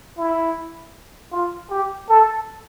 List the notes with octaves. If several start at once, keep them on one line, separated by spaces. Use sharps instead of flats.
E4
F4
G4
A4